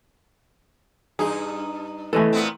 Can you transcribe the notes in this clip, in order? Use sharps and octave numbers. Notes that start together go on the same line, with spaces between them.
G2 D#4 G#4
E3 A3 A4 D#5 G#5
A#2 B3 C4